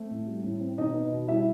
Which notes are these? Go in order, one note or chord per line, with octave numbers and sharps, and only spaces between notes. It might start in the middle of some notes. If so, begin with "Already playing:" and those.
Already playing: A3 C4 A4
A2
G3
A2
C4
B2 D#4 D#5
B3
B2
G3 E4 E5